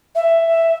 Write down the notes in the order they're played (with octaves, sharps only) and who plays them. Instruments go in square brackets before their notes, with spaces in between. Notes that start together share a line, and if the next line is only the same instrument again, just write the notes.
[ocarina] E5